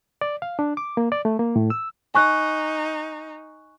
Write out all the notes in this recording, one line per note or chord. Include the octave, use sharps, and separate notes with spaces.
D5
F5
D4
D6
A#3
D5
A3
A#3
A2
E6
D#4 G#5 C#6 F#6